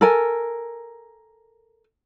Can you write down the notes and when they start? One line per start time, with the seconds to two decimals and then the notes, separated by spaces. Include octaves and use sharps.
0.01 A4 A#4 G#5